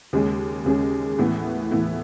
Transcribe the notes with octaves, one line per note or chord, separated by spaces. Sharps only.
D#2 C#3 G#3 C#4 G#4
D#2 C#3 G#3 C#4 G#4
A2 E3 B3 E4
A2 E3 B3 E4